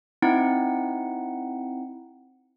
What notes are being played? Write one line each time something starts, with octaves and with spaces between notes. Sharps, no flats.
C4 D#4 E4 F#5